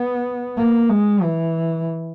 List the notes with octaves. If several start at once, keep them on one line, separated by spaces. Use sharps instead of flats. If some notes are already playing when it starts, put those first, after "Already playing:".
Already playing: B3
A#3
G#3
E3